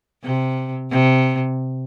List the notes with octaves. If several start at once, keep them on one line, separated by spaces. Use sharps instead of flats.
C3
C3